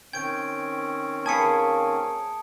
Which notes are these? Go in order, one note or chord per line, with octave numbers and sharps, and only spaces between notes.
D#3 C4 C#4 G5 G#6 D7
A#3 G#4 B4 G#5 A5 D#6 C#7